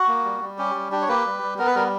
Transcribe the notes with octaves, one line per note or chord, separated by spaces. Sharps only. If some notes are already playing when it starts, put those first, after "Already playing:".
Already playing: F#4
A#3
G3
G3
C#4 G4
G3
D4 G4
C#5
A#3 G4 B4
G3
G3
B3 A#4
B4
G3 A#4